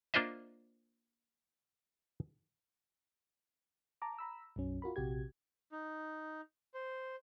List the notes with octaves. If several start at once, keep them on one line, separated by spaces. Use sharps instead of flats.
A#3 D4 F4 C5 D#5 E5
A5 A#5 D6
A#5 B5 E6
B1 F#2 F#3 C#4
F4 F#4 A#4 B5
A#1 C3 F#4 G4 G#6
D#4
C5